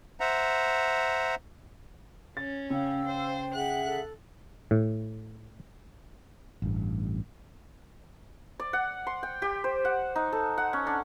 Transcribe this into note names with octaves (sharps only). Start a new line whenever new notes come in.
C5 E5 F#5 A#5
C#4 A6
C#3 F5 G5 E6
C5
G#4 E5 F#5 F#6
A4
A2
A1 G2
D5
F#5
C6
G5
G4
C5
F#5
D#4
A4
F#5
C#4
D4